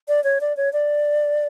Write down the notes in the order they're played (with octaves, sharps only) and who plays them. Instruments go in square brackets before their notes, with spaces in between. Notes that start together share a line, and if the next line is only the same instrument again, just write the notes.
[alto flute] D5
C#5
D5
C#5
D5